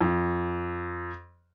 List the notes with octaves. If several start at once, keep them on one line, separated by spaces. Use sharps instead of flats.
F2